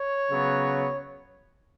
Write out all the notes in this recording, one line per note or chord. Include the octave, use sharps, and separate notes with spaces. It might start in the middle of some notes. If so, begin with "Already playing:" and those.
Already playing: C#5
C#3 F#3 B3